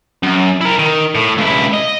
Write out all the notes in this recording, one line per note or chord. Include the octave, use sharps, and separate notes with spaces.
F#2
E4 A#4
D#3
A2
C#2 E4
D#5